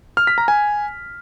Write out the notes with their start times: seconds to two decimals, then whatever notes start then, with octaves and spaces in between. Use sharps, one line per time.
0.17 F6
0.27 B6
0.38 A#5
0.48 G#5